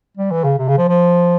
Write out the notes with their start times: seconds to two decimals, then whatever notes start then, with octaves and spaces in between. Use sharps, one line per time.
0.17 G3
0.30 E3
0.44 C#3
0.58 C3
0.68 C#3
0.78 F3
0.88 F3